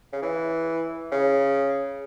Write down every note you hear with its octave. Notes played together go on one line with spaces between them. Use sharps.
C#3
E3
C#3